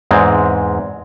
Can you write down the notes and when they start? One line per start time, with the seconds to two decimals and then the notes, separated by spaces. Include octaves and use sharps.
0.11 E2 G#2 G#3 C4